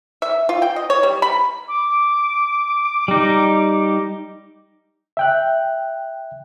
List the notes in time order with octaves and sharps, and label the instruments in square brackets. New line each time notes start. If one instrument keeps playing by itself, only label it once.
[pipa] E5
F4
G5
D#5
C#5
G3
B5
[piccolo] D6
[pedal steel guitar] G3 D#4
[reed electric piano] E5 G5 F#6